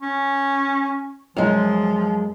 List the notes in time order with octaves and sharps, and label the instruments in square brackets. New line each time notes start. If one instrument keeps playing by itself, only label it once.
[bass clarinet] C#4
[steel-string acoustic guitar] F#2 G#3 [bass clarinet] F3